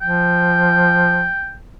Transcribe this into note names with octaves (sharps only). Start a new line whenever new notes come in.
F3 G5